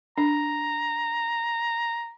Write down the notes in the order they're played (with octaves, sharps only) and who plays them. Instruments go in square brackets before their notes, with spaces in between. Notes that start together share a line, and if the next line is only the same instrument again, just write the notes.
[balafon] D4 [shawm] A#5